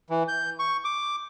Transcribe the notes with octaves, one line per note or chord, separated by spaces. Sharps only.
E3
G6
C#6
D6